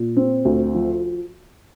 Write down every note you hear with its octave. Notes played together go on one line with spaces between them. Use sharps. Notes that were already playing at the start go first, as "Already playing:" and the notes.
Already playing: A#2
C4
D2
F3